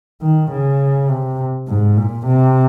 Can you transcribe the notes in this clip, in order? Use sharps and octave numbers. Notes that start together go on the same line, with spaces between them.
D#3
C#3
C3
G#2
A#2
C3